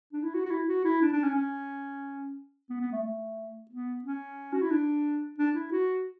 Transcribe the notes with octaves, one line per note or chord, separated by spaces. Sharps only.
D4
E4
F#4
F#4
E4
F#4
E4
D4
D4
C#4
C#4
B3
B3
A3
A3
B3
C#4
F#4
E4
D4
D4
E4
F#4